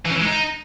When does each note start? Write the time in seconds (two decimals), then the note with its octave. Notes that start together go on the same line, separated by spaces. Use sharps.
0.05 E3
0.10 C#4
0.15 E3
0.20 G#3
0.25 D#4